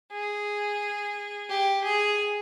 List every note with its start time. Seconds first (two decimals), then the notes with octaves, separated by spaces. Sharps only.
0.12 G#4
1.49 G4
1.84 G#4